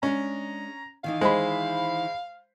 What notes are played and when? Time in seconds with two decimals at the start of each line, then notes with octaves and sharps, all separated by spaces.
0.03 G#3 C#4 D4 A#5
1.04 D#3 E3 D#4 F5
1.21 G#3 C5 B5